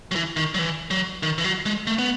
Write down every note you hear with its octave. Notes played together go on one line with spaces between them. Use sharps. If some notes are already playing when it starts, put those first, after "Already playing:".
F#3
E3
D#3
F#3
E3
F#3
D#3
E3
F#3
G#3
A3
B3